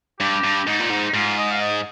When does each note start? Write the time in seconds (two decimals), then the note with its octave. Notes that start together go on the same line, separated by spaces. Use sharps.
0.20 G2 G4
0.44 G2
0.67 G#2 D#4
0.80 A#2
0.90 G#2
1.07 D#4
1.14 G#2 F4
1.37 D#5
1.51 F5
1.60 D#5